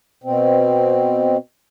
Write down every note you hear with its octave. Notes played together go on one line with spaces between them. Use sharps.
B2 C4